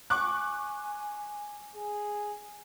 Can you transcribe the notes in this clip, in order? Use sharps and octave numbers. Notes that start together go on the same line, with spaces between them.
G#5 C#6 D6 F#6
G#4